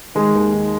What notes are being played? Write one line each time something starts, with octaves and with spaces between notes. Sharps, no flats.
D#3 G#3
D#2
D#3